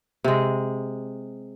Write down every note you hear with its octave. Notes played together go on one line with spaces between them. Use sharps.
C3 G#3